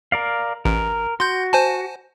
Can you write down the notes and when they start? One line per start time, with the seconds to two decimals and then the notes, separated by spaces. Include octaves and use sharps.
0.12 A#4 D5 F5
0.65 A1 A#4
1.20 F#4 C6 G6
1.53 C5 G#5 A5